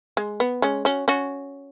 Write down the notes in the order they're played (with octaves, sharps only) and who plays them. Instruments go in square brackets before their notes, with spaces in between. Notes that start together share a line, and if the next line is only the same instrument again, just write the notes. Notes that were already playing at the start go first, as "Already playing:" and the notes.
[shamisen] G#3
B3
G#3 C#4
C#4 F#4
C#4 F#4